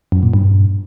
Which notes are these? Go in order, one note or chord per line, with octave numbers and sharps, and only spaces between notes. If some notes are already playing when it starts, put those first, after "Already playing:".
F#2
A#2
G2